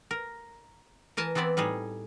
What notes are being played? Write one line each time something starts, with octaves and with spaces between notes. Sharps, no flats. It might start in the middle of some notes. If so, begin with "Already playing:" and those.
A#4
E3 A#4 G#5 A5
E3 B3 C4 E4 D5
A2 G3 D#4 G#4